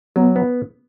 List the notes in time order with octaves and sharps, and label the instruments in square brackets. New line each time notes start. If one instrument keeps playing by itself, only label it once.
[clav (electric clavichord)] F#3 [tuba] B3
[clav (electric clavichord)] B3